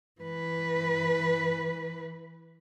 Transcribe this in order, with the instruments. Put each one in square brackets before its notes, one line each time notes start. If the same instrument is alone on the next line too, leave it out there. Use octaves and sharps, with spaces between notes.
[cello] E3 B4